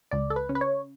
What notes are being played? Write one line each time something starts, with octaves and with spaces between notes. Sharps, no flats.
C#2 D5
A4
B4
C#3
B4
C#5